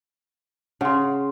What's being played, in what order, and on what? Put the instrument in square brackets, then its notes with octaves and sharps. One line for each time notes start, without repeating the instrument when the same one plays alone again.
[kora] C#3 [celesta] F#5 C6